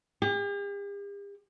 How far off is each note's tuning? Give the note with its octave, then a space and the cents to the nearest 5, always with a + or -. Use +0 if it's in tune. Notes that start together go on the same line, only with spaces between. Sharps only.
G4 +45